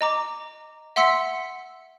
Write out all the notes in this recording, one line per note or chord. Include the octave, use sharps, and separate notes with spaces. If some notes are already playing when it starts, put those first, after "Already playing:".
D#5 A#5 D6
E5 F#5 C6 E6 B6 C#7